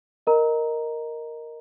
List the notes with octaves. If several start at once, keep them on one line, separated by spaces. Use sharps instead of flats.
A#4 D#5 A#5